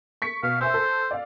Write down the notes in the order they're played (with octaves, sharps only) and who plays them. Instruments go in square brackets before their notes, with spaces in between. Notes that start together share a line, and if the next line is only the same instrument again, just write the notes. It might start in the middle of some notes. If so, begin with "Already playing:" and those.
[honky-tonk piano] C#6 B6 C#7
[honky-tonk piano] B2 [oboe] F5
[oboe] C5 [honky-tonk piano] E5 G#5 E6
[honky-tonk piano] A4
D5 F5